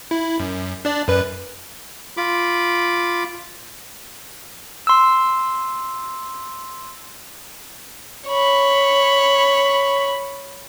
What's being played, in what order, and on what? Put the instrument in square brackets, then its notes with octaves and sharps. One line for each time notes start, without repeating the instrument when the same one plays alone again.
[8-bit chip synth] E4
F#2
D4 D5
F#2 B4
[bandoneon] F4 B5 D6
[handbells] C6 E6
[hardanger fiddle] C#5 B5